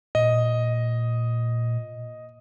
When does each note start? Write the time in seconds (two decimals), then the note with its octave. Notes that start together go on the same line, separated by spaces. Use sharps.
0.15 A#2 D#5